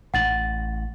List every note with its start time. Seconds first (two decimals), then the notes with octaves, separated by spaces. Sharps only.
0.14 A1 F#5 A6 F#7